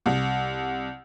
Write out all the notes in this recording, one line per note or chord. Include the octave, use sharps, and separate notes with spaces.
C2